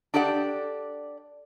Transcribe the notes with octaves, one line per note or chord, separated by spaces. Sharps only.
D4 G4 A4 D5 F#5